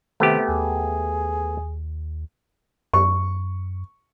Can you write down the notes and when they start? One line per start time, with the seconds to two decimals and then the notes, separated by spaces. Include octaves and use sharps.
0.20 C3 D#3 A3 B3 G4
0.48 D#2 G#4
2.94 F#2 C#6